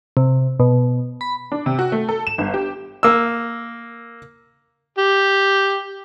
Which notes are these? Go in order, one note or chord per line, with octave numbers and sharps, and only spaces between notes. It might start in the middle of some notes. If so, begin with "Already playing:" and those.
C3
B2
B5
D4
C3
F#4
A3
A4
E7
G1
G4
A#3 E6
G4